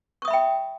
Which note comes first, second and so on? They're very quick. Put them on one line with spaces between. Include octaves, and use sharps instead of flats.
C#6 D#6 E5 B5 G5